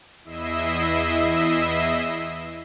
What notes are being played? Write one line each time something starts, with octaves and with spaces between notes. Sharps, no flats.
E2 E4 D#5 E5 E6 C7